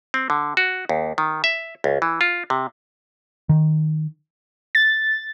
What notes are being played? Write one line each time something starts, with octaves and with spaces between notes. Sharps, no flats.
C4
D3
F#4
D#2
D#3
E5
C#2
E3
F4
C3
D#3
A6